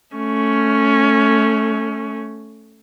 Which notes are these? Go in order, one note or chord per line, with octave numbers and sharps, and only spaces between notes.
A3 C#4